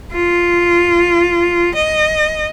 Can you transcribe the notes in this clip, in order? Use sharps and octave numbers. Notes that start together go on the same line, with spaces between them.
F4
D#5